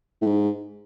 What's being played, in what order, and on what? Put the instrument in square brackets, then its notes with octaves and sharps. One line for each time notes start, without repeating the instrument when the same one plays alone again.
[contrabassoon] A2
G#2